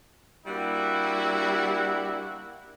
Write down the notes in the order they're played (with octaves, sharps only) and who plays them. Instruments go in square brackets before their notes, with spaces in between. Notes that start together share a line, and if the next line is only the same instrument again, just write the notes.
[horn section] G3 A#3 D4 E4 F#4